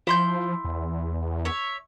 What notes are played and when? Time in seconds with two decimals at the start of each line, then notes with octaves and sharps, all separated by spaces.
0.07 F3 E4 C6 G6
0.64 E2
1.45 C#5 E5